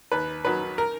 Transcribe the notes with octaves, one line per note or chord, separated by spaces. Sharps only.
D#2 B4
D#3 F#3 B4
A#4